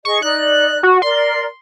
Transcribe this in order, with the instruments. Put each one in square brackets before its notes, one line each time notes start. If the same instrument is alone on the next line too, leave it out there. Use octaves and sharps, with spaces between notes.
[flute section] G#4 D#5 [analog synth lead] C#6
[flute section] D#4 D5 [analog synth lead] F#6
[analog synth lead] F#4
[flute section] A#4 D5 [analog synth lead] C6